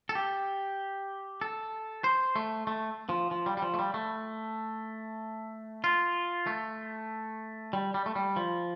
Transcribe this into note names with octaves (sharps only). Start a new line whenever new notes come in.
A4
G4
A4
C5
A3
A3
F3
F3
G3
G3
F3
A3
G3
A3
F4
A3
G3
G3
A3
G3
F3